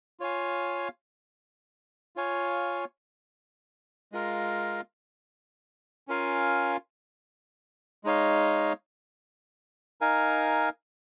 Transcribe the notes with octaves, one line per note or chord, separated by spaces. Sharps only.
F4 C#5 F5 G#5
F4 C#5 F5 G#5
G#3 F4 A#4 F5
C#4 F4 A#4 F5 G#5
G#3 D#4 C#5 F5
D#4 A#4 F5 G#5